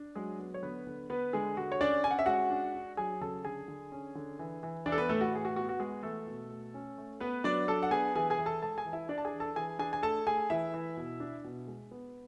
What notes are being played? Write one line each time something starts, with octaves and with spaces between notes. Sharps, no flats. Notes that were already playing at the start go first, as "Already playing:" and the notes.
Already playing: D4
F#3 G#3 G#4
B3
C#5
D3 B3 B4
D3
D3 B3 B4
D3 G#3 G#4
D3 F#4
C#5
C#4 D4 D5
C#4 G#5
F#5
E5
G#3 F#4 F#5
D4
D4
F#3 G#4 G#5
C#3 A4 A5
D3 G#4 G#5
D3
C#4
D3
E3
E3
E3 D4 D5
A4
B3 B4
A2 A3 A4
F#4
E3 G#4
F#4
B3 F#4
F#4
G#3 B3 G#4
E3 A3 A4
B2
A3
C#4
A3
B3 B4
F#3 D4 D5
D4 A4 A5
F#5
B3 G#4 G#5
E3 G#4 G#5
G#4 G#5
E3
A4 A5
G#3 A4 A5
G#4 G#5
E3
E4 E5
D4 D5
A5
G#4 G#5
E3
A4 A5
E3 G#4 G#5
D4 G#4 G#5
G#5
A3 A4 A5
A3 G#4 G#5
E3 E4 E5
E3
B2
D4
B2
G#3
B3